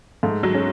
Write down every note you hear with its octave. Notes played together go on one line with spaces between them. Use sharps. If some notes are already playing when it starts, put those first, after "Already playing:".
G#2 A3
F#3
C#4